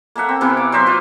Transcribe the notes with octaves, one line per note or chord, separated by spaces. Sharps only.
A#3 A4 E5 F#5
C4
C3 E3 A#3 B3
D6
F#3 C5 E5 C6
F4 C5